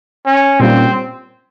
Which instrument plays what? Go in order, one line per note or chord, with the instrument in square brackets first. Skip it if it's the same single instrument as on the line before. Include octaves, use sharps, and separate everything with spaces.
[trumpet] C#4
[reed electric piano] A#2 G3 A#3 C#4 F4 [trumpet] C4